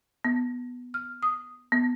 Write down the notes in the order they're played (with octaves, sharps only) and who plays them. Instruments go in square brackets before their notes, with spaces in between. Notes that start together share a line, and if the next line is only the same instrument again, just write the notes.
[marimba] B3
F6
D#6
B3